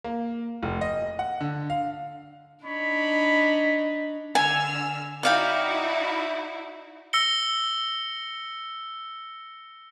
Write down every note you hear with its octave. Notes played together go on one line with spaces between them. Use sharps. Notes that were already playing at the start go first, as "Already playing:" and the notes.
A#3
F1
D#5
F#5
D3
F5
D4 D#4 C#5 B5
D3 G#5 E6 F6
D#4 E4 F#4 D5 F5 G5
E6 A#6 C#7 G7